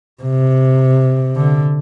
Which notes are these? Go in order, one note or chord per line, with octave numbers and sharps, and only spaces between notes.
C3
D3